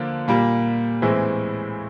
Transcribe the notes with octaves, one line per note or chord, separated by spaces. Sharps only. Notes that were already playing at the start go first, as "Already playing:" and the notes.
Already playing: D3 F3 A#3 D4 F4
A#2 G3 A#3
A2 E3 G#3 C4 E4